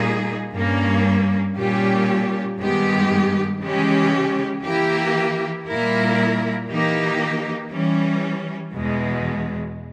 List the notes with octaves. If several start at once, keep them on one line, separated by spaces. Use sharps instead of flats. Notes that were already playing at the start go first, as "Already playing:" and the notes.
Already playing: A#2 G3 A#3 D#4 G#4
G2 G3 A#3 C#4
A#2 G3 C#4 G4
G2 D#3 G#3 B3 G4
C#3 E3 G#3 C#4 G4
E3 A#3 E4 G4
A#2 G3 A#3 E4 A#4
E3 A#3 D#4 G4
E3 G3 C#4
E2 B2 G#3